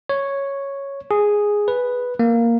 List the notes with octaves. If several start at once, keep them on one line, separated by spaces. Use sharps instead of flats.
C#5
G#4
B4
A#3